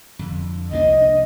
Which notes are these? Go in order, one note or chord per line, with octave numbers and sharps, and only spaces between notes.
F2 D3
C2 A#3 D4 D#5